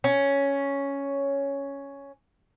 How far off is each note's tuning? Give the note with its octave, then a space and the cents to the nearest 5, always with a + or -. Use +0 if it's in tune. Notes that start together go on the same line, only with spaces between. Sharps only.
C#4 +5